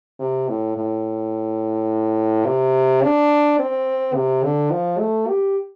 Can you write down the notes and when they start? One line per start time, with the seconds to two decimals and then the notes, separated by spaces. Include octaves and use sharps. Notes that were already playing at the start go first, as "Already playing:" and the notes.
0.20 C3
0.49 A2
0.76 A2
2.46 C3
3.03 D4
3.59 C4
4.15 C3
4.44 D3
4.71 F3
4.99 A3
5.28 G4